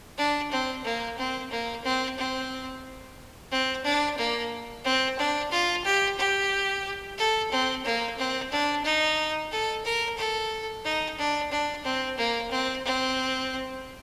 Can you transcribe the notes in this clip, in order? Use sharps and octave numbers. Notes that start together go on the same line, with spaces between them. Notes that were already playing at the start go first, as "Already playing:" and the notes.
D4
C4
A#3
C4
A#3
C4
C4
C4
D4
A#3
C4
D4
F4
G4
G4
A4
C4
A#3
C4
D4
D#4
A4
A#4
A4
D#4
D4
D4
C4
A#3
C4
C4